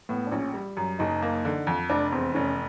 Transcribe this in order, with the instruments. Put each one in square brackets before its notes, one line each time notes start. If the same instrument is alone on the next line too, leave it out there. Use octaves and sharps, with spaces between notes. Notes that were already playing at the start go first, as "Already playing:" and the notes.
[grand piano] A2 [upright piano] B3
[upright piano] D4
[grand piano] A#1 [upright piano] C#4
[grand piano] G3
F#2
[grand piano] F#1 [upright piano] D#4
[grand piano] A#3
D3
F2
[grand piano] F1 [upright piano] D4
[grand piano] E2 [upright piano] C4
[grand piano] F1 [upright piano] C#4